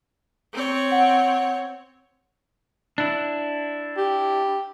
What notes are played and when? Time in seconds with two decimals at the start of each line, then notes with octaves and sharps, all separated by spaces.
0.53 C4 C#5
0.91 F#5
2.98 D4 E4
3.97 G4